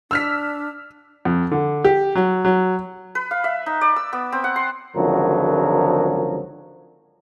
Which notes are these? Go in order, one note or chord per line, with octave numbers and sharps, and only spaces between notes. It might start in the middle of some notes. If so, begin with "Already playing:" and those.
D4 E6 F6 B6
F2
D3
G4
F#3
F#3
B4
F5
E5
D#4
D5
E6
B3
C4
F#5
C6
G#1 C#2 D3 F3 F#3 A#4